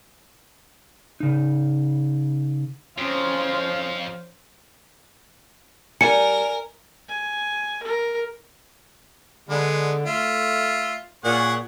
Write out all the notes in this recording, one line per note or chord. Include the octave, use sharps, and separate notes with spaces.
C#3 D#4
F2 C#4 C5 F5 C6
G3 A#4 G#5 C#7
G#5
A#4
D3 G#3 B3
A3 F4 E5
A#2 G#4 C#5 F#5